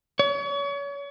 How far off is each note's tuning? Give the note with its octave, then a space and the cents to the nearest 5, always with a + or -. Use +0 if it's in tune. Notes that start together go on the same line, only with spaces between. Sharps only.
C#5 +35